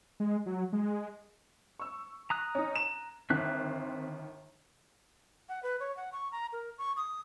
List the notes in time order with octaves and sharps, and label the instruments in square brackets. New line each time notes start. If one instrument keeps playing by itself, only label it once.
[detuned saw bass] G#3
F#3
G#3
[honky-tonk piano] C#6 E6
[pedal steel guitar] A#5 D#6 F#6
[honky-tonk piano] C#4 D#4
E7
[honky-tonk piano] G1 D#3 [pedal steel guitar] C4 E5 F#6
[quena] F#5
B4
C#5
F#5
C#6
A#5
A#4
C#6
D#6